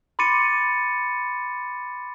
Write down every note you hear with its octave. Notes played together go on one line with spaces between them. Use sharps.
B5 C6 D6 A6 C#7 D#7